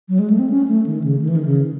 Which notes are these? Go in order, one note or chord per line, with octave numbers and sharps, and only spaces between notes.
F#3
G#3
A3
C4
C#4
A3
D#3
C#3
D#3
E3
D#3
C#3